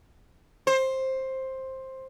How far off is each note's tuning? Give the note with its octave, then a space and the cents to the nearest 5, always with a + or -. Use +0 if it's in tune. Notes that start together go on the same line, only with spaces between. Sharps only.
C5 +10